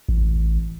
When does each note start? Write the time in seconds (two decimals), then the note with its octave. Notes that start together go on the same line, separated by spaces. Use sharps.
0.09 A1